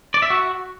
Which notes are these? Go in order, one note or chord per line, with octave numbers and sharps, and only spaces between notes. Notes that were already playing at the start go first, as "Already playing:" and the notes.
D5
E5
F#4